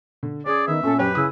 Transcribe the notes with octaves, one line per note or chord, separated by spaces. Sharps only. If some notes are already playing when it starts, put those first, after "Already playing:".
D3
C#4 G#4 D5
D#3 B3 E5
A#2 C#4 A4
F#2 G4 B4 C#5 G5
C#3 E4 D#6